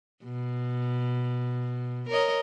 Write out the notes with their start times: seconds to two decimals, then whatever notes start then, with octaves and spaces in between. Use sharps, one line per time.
0.24 B2
2.09 A#4 C#5 D#5